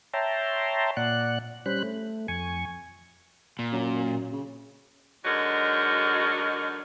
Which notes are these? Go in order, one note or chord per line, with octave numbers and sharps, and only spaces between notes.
C#5 E5 G5 A5 A#5 C6
A#2 D5 F#5 F#6
G3 C#4 C5 B5 F#6
A3
F2 G#5 C#6
A#2
F#2
C#3
D3 F#3 G#3 D#4 F#4 A#4